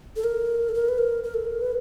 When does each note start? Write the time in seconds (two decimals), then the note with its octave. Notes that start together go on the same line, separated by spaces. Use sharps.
0.16 A4
0.24 A#4
0.69 A4
0.74 A#4
0.88 B4
0.98 A#4
1.23 A#4
1.34 A4
1.45 A#4
1.61 B4